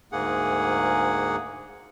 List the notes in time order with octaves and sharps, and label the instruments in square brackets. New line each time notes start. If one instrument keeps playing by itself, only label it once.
[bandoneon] D2 G#2 A#3 G#4 F#5